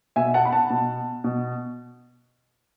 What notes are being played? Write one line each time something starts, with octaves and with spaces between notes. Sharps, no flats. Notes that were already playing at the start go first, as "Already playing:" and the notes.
B2 E5 G#5
F#5 A5
B5
F#5 A5
B2
B2